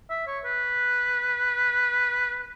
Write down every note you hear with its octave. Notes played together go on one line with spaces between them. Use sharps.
E5
C#5
B4